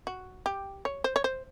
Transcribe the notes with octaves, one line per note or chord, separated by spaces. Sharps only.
F#4
G4
C#5
C5
C#5
C5